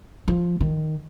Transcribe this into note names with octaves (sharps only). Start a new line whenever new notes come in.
F3
D#3